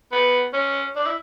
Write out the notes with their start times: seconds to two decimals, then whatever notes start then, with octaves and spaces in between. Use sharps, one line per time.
0.12 B3
0.54 C#4
0.96 D4
1.06 E4